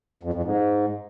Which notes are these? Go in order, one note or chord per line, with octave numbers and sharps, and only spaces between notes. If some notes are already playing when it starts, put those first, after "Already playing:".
F2
F2
G#2